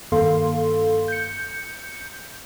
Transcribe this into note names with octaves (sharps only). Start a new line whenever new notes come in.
G2 D#3 A#3 A4 F5 C6
G6 C#7